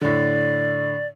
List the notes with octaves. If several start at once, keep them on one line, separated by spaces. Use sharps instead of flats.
A2 D3 D5